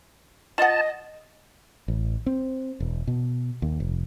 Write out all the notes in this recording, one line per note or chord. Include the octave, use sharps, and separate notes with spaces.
F4 D#5 F#5 A5
A1
C4
E1
B2
D#2
F1